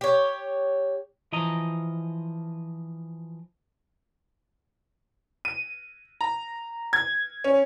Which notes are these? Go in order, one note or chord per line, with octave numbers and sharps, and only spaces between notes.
G4 C#5
E3 F3 D#5 A#5
D#7
A#5
G#6
C#4